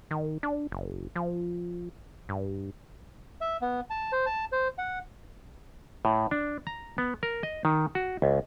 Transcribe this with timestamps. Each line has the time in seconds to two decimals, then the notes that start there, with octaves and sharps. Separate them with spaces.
0.11 D#3
0.43 D4
0.71 F#1
1.16 F3
2.29 G2
3.41 E5
3.62 B3
3.90 A5
4.12 C5
4.26 A5
4.52 C5
4.78 F#5
6.05 A2
6.31 D4
6.67 A#5
6.98 B3
7.23 A#4
7.43 D#5
7.65 D#3
7.95 F#4
8.22 C#2